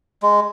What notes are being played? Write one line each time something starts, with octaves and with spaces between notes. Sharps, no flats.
G#3